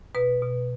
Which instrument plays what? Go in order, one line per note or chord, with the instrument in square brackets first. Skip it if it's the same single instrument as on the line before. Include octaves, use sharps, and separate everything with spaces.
[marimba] B2 B4
B2